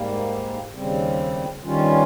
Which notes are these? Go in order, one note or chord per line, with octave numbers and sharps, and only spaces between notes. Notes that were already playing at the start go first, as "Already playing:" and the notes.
Already playing: G#2 G3 A#3
D#2 C#3 G3 C4
G2 D#3 G3 C#4 F4